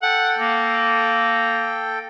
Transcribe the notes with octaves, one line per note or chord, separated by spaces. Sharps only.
A4 F#5 G5
A#3